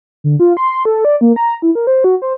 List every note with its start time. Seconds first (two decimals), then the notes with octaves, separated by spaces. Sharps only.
0.24 D3
0.40 F4
0.57 C6
0.85 A4
1.05 D5
1.21 A#3
1.36 A#5
1.62 E4
1.75 A#4
1.87 C5
2.04 F#4
2.22 C5